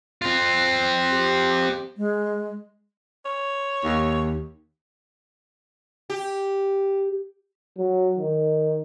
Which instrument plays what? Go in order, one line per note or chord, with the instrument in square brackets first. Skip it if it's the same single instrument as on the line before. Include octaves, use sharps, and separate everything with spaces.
[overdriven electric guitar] C4 F4
[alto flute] G4
G#3
[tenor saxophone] C#5
[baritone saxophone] D#2
[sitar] G4
[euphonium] F#3
D#3